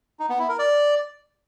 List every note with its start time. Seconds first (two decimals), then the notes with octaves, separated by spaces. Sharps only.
0.19 D#4
0.29 B3
0.39 E4
0.49 A#4
0.59 D5